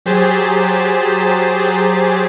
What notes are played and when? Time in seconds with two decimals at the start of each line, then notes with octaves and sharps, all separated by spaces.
0.06 F#3 G4 G#4 C5 A6